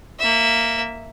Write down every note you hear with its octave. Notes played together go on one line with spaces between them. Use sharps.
A#3 E5